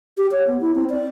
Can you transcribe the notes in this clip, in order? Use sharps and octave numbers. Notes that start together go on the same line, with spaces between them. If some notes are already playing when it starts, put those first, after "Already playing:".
G4
C#5
B3
E4
C4
D5